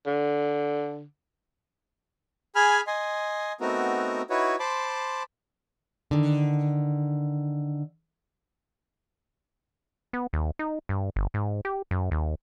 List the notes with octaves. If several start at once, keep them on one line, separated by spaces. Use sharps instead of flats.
D3
G#4 G#5 B5 F6
D#5 G#5 C6
A3 B3 C4 D#4 F#4 A#4
D#4 E4 F#4 B4 C#5
C5 A5 B5 C6 D6
D3 D#3
B3
D#2
D#4
G2
G1
G#2
G4
F#2
D#2